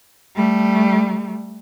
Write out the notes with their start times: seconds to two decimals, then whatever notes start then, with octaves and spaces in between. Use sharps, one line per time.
0.36 G3 A3